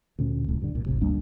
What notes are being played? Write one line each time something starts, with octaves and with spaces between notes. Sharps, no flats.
D2 A#2 C#4
D1 C2
G2 D3
C2 A#2
D1 G#1 C3
D2 G3 A#3 D4